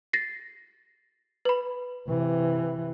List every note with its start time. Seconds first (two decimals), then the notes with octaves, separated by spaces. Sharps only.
0.13 A6 A#6 C7
1.45 B4 B5
2.08 C3 E3